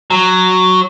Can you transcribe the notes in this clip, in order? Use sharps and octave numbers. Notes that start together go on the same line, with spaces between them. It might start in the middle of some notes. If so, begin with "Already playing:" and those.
F#3